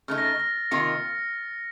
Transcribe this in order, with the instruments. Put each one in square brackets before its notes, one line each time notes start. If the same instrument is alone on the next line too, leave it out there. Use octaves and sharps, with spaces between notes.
[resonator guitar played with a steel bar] C#3 A3 D#4 [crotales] F6
[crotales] A#6
A6
A#6
[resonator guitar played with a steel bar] C3 D#3 A#3 F4 [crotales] C#7